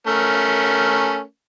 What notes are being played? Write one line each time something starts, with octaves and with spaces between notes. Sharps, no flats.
A3 C#4 A#4